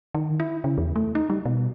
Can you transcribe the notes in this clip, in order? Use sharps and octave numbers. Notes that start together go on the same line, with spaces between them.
D#3
E4
C#3
E2
A3
D#4
G3
B2